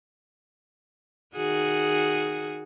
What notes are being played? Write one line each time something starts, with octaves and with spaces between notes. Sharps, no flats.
D#3 F#4 G#4